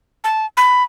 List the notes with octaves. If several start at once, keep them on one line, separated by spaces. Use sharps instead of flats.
A5
B5